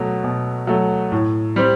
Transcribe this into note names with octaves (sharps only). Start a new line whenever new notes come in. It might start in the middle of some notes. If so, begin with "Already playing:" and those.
Already playing: B2 F#3 A3
B2
F#3 A3
A2
G3 C4 G4